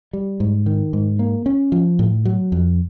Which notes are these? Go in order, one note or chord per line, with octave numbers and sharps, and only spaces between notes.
G3
G#2
D#3
G#2
A#3
C#4
F3
A2
F#3
F2